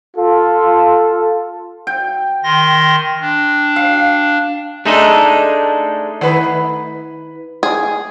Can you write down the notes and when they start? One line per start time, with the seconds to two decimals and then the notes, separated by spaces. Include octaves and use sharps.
0.17 F4 A4
1.87 G5
2.44 D#3 C6 A#6
3.21 D4
3.76 F5
4.86 G#3 A3 D4 D#4 A4
6.21 D#3 B4
7.63 G#4